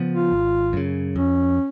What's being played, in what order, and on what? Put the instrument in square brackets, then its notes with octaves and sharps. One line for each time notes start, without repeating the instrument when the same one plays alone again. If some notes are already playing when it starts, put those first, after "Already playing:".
Already playing: [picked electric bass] C#3 F3 B3
[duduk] F4
[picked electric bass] G#1
F#2 C#3
[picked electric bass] F2 [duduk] C#4